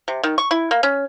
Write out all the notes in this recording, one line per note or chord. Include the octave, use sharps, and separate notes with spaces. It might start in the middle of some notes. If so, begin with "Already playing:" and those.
C3
D#3
C#6
E4
A#3
C#4